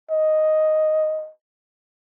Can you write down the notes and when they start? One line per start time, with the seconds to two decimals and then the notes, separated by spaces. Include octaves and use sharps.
0.11 D#5